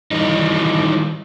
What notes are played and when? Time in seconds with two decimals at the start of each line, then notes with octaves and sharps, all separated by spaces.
0.11 D#3 E3 G3 D#4